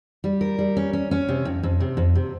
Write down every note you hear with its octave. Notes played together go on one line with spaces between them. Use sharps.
G3
A#4
G3
C#4
C#4
C#4
C3
F2
F2
C3
F2
C3